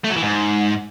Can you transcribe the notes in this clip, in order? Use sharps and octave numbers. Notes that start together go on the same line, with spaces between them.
A3
F#3
E3
G#2